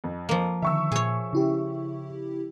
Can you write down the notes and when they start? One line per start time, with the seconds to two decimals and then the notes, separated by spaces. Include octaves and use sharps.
0.04 F2
0.29 F3 A#3
0.62 D3 D#3 E5 C#6 E6
0.92 A#2 G#4 C#5
1.33 C#3 E4 G4